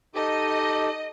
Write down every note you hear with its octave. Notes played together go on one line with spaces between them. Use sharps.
D#4 G4 A4 D#5